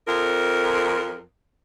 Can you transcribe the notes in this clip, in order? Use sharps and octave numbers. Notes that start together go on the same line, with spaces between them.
F2 A#4